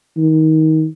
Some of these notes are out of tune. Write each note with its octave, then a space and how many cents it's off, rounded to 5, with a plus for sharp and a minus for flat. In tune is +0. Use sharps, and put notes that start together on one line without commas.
D#3 +25